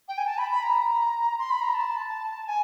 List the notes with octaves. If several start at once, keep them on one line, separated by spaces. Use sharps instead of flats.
G5
G#5
A5
B5
B5
A#5
C6
B5
A#5
A5
G#5